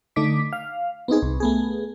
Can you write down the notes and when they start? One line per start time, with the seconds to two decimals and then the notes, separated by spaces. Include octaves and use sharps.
0.16 D3 A3 D#4 D6 B6
0.53 F5
1.08 B3 C4 D#4 G#4
1.22 C2
1.40 A3 B3 G#4